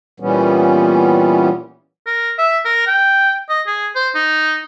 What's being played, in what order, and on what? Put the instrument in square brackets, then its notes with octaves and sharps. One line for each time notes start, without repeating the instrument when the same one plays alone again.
[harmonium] A#2 E3 G3 B3 C#4
[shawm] A#4
E5
A#4
G5
D#5
G#4
C5
D#4